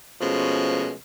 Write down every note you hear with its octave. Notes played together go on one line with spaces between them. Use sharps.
B2 F3 G#3 A3 C#4